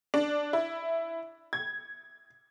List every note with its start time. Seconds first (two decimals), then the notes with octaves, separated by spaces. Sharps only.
0.14 D4
0.53 E4
1.53 G#6